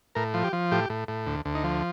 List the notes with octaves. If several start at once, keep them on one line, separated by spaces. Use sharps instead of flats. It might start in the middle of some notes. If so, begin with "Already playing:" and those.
A2 A#4
F3
G4
F3
A2 G4
A2
A2
D2
D2
D#4
F3